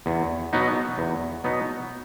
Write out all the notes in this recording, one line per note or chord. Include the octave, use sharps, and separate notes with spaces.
E2
B2 F#3 B3 D#4
E2
B2 F#3 B3 D#4